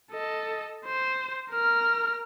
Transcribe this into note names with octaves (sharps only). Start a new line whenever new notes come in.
A4 D#5
C5
A#4 F6